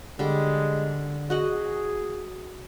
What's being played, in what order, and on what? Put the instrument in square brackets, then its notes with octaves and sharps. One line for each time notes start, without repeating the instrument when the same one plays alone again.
[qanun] D3 G3 [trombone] G#3
[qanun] F#4 D#5 F#5 [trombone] G#4